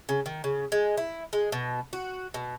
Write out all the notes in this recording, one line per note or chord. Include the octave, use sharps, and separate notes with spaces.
C#3
D#3
C#3
G#3
E4
G#3
B2
F#4
B2